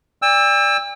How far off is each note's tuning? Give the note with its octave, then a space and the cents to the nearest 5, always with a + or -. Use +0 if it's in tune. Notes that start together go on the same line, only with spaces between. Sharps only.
D5 +0 G5 +45 E6 +0